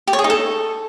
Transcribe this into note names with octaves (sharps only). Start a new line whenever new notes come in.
G4
C#5
G#4
D#4
A4